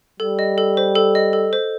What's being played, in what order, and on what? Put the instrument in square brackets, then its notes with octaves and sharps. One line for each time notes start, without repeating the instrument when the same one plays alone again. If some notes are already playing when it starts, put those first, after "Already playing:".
[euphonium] G3 [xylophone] A4
[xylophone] D#5
A4
C5
A4
D#5
A4
C5